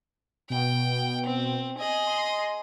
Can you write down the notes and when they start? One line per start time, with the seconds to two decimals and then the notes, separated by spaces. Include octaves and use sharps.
0.50 B2 G5
1.26 C4
1.78 G#4 D#5
2.07 C6